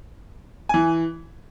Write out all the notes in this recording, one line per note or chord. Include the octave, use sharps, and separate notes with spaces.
E3 G#5